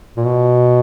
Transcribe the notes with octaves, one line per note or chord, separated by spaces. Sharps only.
A#2
B2